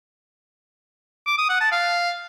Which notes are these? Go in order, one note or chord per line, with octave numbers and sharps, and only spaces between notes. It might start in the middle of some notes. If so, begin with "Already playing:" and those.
D6
D#6
F#5
A5
F5